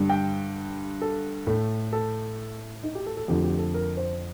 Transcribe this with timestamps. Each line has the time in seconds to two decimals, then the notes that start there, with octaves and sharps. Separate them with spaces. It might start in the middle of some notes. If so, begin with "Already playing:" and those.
Already playing: G2 D3 G3
0.09 G5
1.01 A4
1.47 A2 A3
1.93 A4
2.83 D#4
2.95 G4
3.06 A4
3.17 A4
3.28 F2 D3 F3 A3 G4
3.44 G4
3.59 A4
3.74 A#4
3.97 C5